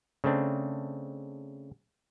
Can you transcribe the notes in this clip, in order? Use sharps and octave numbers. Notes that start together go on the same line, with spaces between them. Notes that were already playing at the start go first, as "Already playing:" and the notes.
C#3 A3 C4 D4